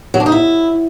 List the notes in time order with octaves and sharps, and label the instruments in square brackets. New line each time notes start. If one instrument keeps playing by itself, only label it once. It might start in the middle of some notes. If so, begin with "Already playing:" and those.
[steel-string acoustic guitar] F#3
D4
D#4
E4